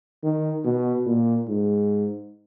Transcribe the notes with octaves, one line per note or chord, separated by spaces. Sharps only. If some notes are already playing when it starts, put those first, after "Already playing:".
D#3
B2
A#2
G#2